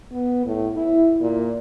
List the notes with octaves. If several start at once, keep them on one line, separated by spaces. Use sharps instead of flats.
B3
A2
E4
A#2